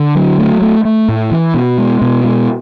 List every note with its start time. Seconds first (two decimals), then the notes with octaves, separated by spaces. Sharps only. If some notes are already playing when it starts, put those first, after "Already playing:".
Already playing: D3
0.15 F#3
0.38 A3
0.62 A3
0.85 A3
1.08 A2
1.31 E3
1.54 B2
1.78 G#3
2.02 B2
2.24 G#3